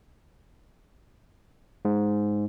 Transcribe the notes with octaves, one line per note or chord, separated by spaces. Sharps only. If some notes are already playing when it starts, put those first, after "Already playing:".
G#2